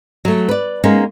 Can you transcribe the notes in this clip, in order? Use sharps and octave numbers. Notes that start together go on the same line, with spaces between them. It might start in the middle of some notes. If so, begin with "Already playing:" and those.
F#3 A3
B4 D5
G#3 A#3 B3 C#4 D#4